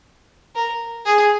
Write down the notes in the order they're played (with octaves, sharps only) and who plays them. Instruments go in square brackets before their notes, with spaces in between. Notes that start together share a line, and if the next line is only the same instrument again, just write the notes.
[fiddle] A#4
G#4